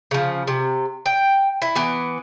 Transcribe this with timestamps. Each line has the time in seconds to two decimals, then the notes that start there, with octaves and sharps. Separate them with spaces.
0.11 C#3 F3
0.47 C3
1.06 G5
1.62 E4
1.75 E3 B3